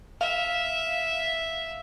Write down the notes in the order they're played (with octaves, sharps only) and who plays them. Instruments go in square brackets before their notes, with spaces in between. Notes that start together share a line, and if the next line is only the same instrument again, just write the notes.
[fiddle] E5 [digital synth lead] F5